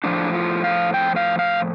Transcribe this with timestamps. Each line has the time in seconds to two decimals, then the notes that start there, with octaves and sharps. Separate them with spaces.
0.04 A2 F3 D4
0.34 F4
0.64 F5
0.94 G5
1.16 F5
1.39 F5